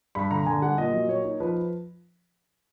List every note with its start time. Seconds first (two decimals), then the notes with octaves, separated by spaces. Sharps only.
0.15 G2 B5
0.31 D3 A#5
0.46 D3 G#5
0.62 G3 F#5
0.78 A#2 D#5
0.94 F#3
1.08 A#2 C#5
1.24 D#4
1.40 F3 B4